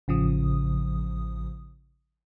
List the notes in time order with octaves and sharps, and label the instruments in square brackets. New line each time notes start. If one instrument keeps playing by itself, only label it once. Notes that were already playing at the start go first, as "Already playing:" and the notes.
[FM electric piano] A1 C#3 F3 D#6